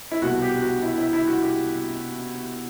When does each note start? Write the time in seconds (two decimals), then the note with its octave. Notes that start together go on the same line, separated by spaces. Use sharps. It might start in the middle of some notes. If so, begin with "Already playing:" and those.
0.11 E4
0.21 C2 B2 F#4
0.42 G4
0.62 F#4
0.83 E4
0.98 E4
1.13 E4
1.27 F#4
1.42 G4